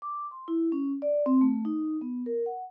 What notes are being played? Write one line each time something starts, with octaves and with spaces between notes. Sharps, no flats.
D6
C6
E4
C#4
D5
C4
A3
D#4
B3
A#4
F#5